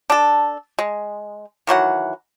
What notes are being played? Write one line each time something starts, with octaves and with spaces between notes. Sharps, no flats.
D4 A4
G#3
D#3 E3 F#3 F#5